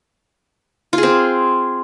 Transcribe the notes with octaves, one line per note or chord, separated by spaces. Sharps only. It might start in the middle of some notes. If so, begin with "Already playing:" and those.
F4
G#4
C4